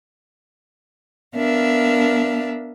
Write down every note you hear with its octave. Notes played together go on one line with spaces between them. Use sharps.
B3 D4 A#4 E5 F5